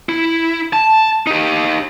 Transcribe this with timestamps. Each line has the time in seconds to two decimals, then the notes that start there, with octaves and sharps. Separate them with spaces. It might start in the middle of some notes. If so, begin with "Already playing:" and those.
0.09 E4
0.73 A5
1.27 D#4 G4